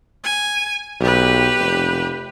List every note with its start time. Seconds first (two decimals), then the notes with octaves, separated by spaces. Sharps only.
0.24 G#5
1.00 B1 G4 B4
1.59 F1